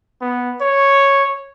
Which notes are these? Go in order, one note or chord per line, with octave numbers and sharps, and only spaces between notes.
B3
C#5